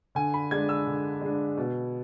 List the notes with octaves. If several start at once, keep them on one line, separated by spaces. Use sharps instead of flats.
D3 G#5
B5
G#3 D4 G#6
E6
D3
G#3 D4
B2